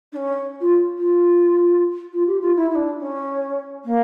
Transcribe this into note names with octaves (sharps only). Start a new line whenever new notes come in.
D4
C#4
F4
F4
F4
G4
F4
E4
E4
D4
C#4
A#3